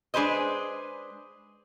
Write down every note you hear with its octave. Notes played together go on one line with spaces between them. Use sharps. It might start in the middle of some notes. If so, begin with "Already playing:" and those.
G#3 D4 G#4 B4 C5 D#5